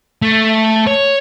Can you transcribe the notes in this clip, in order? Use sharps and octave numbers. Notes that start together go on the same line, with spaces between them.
A3
C#5